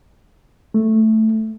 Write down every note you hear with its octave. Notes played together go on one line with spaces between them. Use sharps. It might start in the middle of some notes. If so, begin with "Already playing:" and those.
A3